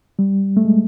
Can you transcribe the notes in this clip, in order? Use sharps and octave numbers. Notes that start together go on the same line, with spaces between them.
G3
A3
G#3